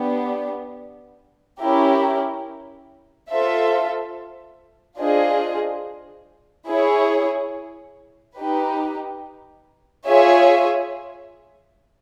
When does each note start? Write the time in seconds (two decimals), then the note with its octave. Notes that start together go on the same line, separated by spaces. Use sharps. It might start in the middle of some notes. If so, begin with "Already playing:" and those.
Already playing: B3 D4 G4
1.60 C#4 E4 G4 A#4
3.29 F4 A4 C5 E5
4.98 D4 F4 G#4 C5 D#5
6.67 E4 G#4 C#5
8.37 D#4 G4 B4
10.06 F4 G#4 C#5 E5 G#5